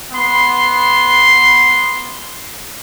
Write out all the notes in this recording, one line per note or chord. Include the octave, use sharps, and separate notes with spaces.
B3 C6